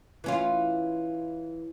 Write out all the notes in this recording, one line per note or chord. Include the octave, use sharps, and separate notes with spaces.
E3 C#4 F4